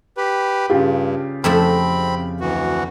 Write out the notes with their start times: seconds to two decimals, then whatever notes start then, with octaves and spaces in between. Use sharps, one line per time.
0.17 G4 B4
0.70 G2 C#3 F4 G4
1.44 F2 A3 C4 E4 B5
2.41 D2 E3 F#4